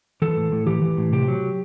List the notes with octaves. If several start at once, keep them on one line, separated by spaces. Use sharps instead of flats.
E3 A4
A2
A2
E3 G4
E3
A2
C3 G4
F#3